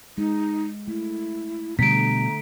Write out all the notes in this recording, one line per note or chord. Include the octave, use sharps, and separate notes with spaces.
G#3 D#4
A3 E4
B2 D3 G3 A3 A#5 B6 D7